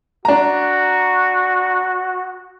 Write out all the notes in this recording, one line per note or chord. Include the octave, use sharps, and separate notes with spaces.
D4 F#4 A#5